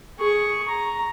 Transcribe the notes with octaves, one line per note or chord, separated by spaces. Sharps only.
G#4 C#6
A#5